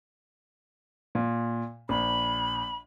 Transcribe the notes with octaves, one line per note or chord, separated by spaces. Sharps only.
A#2
A#1 B5